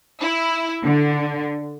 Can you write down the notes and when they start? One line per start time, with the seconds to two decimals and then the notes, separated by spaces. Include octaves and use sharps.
0.21 E4
0.84 D3